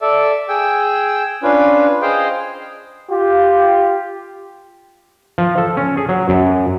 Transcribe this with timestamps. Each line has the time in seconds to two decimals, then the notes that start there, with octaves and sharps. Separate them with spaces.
0.01 A4 D5 E5
0.49 G#4 G5 E6
1.43 C#4 D4 F4 B4
2.02 G#4 C5 D#5 F5 G5
3.10 F4 G4
5.38 F3
5.58 A4
5.77 C#4
5.97 G#4
6.09 F#3
6.29 F#2